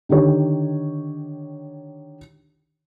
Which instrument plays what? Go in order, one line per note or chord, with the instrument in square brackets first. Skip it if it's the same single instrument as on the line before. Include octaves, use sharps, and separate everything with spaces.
[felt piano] D3 D#3 G4 C#5